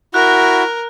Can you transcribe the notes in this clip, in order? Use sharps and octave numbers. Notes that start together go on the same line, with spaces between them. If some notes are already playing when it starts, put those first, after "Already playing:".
E4 F#4 A#4 F#6